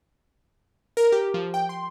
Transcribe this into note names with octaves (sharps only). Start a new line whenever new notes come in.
A#4
G4
F3
G5
C6